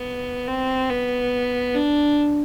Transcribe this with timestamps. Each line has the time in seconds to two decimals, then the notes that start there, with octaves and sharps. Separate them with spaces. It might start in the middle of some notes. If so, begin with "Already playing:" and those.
Already playing: B3
0.48 C4
0.91 B3
1.75 D4